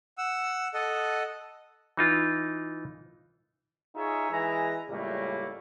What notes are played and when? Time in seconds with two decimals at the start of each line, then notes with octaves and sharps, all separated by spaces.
0.18 F#5 E6
0.74 A4 D#5 F#5
1.97 E3 D#4 F4
3.95 D#4 F4 G#4 C#5 E5
4.31 E3 G#3 G#4 A#5
4.89 C#2 A2 G3 A3 A#3